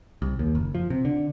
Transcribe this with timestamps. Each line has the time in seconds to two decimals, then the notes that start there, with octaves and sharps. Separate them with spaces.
0.22 C2
0.39 D#2
0.55 F#1
0.75 F3
0.90 C3
1.05 D3